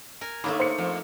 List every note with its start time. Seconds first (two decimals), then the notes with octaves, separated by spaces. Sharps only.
0.21 A#4 G#5
0.44 D#2 A3 A#3 D4 B5
0.60 C5 C#7
0.78 F2